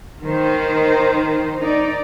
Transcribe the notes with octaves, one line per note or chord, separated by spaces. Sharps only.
D#3 C5
D#4 D5